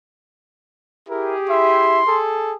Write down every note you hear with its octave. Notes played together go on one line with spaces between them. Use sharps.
E4 G4 G#4 A#4
E4 E5 C6
G#4 A4